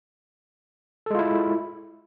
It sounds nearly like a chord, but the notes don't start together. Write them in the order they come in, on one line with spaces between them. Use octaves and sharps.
A4 G#3 F4 E4